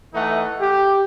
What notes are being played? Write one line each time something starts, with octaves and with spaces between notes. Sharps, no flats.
E3 A3 D#4 F#5
G4